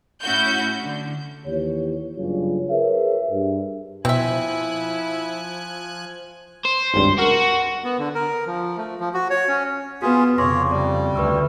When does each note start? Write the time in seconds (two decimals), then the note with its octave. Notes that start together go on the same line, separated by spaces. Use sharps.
0.22 A2 C#4 E4 F#4 G6
0.83 D3
1.46 D#2 E3 G4 C#5
2.16 F#1 G2 C#3 F#3 F4 C#5
2.69 G#4 A#4 B4 C#5 E5
3.31 G2
4.05 B2 F3 C4 E4 E5 G#5 F#6
6.65 C5
6.94 G#1 C#2 G2
7.19 F#4 A#4
7.84 B3
7.98 D3
8.15 A#4
8.47 F3
8.77 A3
9.00 F3
9.14 F#4
9.30 C#5
9.48 C#4
10.02 B3 F4 F#4 G#4 B4
10.38 F2 C#3 C#5 C6 D6 A#6
10.71 G3 D5
11.16 D2 B4 C#6 E6